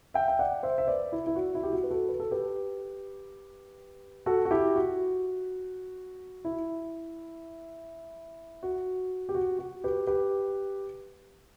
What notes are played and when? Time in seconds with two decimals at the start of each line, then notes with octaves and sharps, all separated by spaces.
0.14 E5 G5
0.28 G5
0.39 D5 F#5
0.63 C5 E5
0.78 E5
0.87 B4 D5
1.12 E4
1.27 E4
1.36 F#4
1.55 E4
1.63 G4
1.73 F#4
1.84 B4
1.91 F#4 A4
2.09 B4
2.20 A4
2.31 G4 B4
4.26 F#4 A4
4.45 F#4
4.51 E4 G4
4.75 F#4
6.45 E4
8.63 F#4
9.29 G4
9.35 F#4
9.59 F#4
9.84 G4 B4
10.07 G4 B4